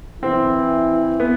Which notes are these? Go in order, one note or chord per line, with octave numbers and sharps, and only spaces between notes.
E3 C4
B3